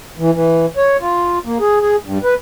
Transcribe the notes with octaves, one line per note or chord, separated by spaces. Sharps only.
E3
E3
C#5
F4
A#3
G#4
G#4
G2
B4